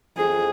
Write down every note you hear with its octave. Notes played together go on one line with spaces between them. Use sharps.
F2 G#4